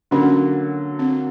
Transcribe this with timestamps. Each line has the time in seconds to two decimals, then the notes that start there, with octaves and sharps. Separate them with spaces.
0.11 D3 F#3 A#3 C#4
0.99 C4